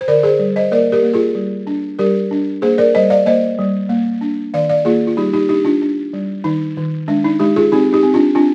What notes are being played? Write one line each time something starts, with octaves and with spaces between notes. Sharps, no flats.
C5
D3 A#4 D5
G#4 C5
G3
C5 D#5
A#3 A#4 D5
G4 A#4
A#3
F4 G#4
G3
D4
G3 G4 A#4
D4
A#3 G#4 C5
A#4 D5
G3 C5 D#5
D5 F5
A#3 C5 D#5
G3
A#3
D4
D#3 D5 F5
D5 F5
A#3 F4 G#4
F4
G3 D#4 G4
D#4 G4
D4 D#4 G4
D4 F4
D4
G3
D#3 D#4
D#3
G#3 D4
D#4
G#3 D#4 G4
F4 G#4
C4 D#4 G4
D#4 G4
C4
D4 F4
C4 D4 F4